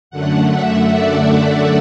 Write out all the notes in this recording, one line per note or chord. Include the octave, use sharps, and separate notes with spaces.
F#2 D3 A3 F#5
E5
D5